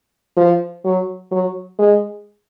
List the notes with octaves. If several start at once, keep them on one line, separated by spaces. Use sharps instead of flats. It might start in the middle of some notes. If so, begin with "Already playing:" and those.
F3
F#3
F#3
G#3